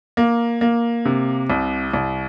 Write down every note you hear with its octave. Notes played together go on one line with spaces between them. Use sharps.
A#3
A#3
C3
C2
C2